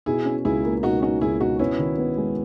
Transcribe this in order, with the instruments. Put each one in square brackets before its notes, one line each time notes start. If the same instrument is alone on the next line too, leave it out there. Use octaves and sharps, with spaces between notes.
[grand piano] B2 [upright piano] E4 G#4
[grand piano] C#4
[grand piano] C#2 [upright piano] E4 G#4
[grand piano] A#3
[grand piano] B2 [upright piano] D#4 F#4
[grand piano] C#4 [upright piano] D#4 F#4
[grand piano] C#2 [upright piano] E4 G#4
[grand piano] B2 [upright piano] D#4 F#4
[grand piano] B3 [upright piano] C#4 E4
[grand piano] D#3
B3
G#3